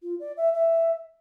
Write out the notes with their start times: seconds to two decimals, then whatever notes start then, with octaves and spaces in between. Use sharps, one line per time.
0.03 F4
0.20 D5
0.37 E5
0.54 E5